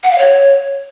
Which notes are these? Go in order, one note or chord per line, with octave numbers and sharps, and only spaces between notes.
F#5
F5
C#5